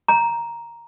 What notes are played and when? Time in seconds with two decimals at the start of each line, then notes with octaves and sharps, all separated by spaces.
0.08 A#5